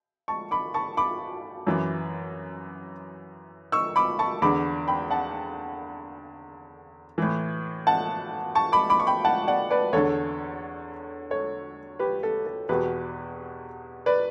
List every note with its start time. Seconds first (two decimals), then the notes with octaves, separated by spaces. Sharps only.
0.28 A5 C#6
0.51 B5 D6
0.74 A5 C#6
0.97 B5 D6
1.67 F#2 E3
3.72 C#6 E6
3.96 B5 D6
4.19 A5 C#6
4.42 E2 D3 B5 D6
4.88 G5 B5
5.10 F#5 A5
7.18 A2 E3
7.87 F#5 A5
8.55 A5 C#6
8.72 B5 D6
8.90 B5 D6
9.00 C#6
9.07 G5 B5
9.25 F#5 A5
9.47 D5 F#5
9.70 B4 D5
9.93 E2 D3 A4 C#5
11.30 A4 C#5
11.99 G4 B4
12.23 A4
12.46 A4
12.69 E2 B2 G4 B4
14.06 B4 D5